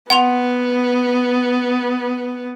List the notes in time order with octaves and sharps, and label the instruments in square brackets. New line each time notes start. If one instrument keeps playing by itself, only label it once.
[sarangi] B3 [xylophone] F#5 C6 F7